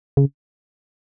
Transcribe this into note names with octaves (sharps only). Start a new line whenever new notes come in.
C#3